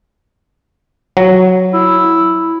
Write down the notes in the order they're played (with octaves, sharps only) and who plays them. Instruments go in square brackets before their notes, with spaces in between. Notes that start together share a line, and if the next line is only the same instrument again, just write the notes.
[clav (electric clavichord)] F#3
[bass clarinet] E4